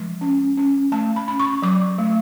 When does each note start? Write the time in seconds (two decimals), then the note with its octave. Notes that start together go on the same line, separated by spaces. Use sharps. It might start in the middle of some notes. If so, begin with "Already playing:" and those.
Already playing: F3 G#3
0.21 C#4
0.57 C#4
0.92 A3 A5
1.16 B5
1.28 C#4 B5
1.40 C#6
1.62 F#3 D6
1.98 A3